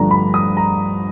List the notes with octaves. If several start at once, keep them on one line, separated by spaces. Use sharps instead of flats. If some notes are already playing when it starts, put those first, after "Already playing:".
Already playing: G2 D3 F3 A3 D4 A#5
B5
D#6
A#5